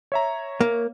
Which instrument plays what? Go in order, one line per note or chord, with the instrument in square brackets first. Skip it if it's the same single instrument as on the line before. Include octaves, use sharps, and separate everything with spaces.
[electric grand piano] C#5 E5 A#5
[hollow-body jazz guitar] A#3